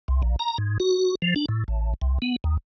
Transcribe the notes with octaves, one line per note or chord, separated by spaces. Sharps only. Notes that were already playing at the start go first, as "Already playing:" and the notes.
C2
A#1
A#5
G#2
F#4
F3
D4
A2
A1
C2
B3
D#2